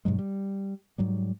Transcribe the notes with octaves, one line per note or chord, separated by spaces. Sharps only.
G2 B2 F#3 G#3
G3
G#2 F#3 G3